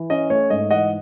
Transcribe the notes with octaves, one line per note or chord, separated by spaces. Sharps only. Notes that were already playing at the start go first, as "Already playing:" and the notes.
Already playing: E3
C#4 D#5
A3 C#5
G#2 D#5
E3 D#5 F#5